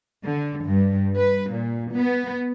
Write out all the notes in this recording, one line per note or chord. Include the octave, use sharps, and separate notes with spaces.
D3
G2
B4
A#2
B3